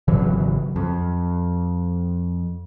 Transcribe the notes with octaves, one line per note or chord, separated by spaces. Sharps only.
G#1 C#3 E3 F#3
F2